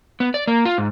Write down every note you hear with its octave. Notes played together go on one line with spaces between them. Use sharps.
B3
D5
A#3
F4
G#2